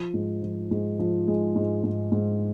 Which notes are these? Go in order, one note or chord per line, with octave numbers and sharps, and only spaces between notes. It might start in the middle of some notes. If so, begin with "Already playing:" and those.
Already playing: F3
G#2
F3
G#2
F3
G#3
G#2
G#2
G#2